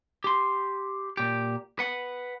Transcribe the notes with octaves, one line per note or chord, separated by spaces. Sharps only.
G4 C6
A#2 G4
B4 F#5